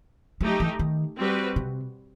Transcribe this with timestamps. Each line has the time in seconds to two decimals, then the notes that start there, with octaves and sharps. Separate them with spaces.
0.41 F#3 A3 D#4 G4
0.60 E3
0.79 D#3
1.18 G3 C4 F#4 B4
1.56 C3